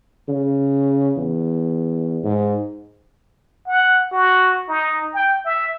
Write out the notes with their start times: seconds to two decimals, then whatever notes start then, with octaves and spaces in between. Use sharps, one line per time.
0.28 C#3
1.17 E2
2.24 G#2
3.67 F#5
4.12 F#4
4.69 D#4
5.14 G5
5.45 E5